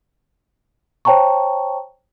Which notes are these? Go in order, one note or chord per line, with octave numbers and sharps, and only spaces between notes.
C5 C#5 G5 A5 A#5 C#6